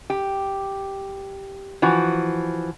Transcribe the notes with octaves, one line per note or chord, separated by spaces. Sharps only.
G4
E3 F3 F#4